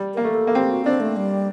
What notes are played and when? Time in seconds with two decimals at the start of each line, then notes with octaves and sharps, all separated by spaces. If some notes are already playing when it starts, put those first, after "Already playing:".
Already playing: G3
0.14 A#3 A#4
0.24 A3
0.34 A4
0.47 A#3
0.55 C4 G4
0.71 F#4
0.85 C4 D4
1.00 A3
1.16 G3